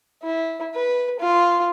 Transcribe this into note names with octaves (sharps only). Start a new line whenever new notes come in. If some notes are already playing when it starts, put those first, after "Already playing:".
E4
B4
F4